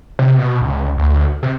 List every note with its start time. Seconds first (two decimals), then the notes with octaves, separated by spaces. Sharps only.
0.19 C3
0.38 B2
0.61 C#2
0.98 D2
1.43 C3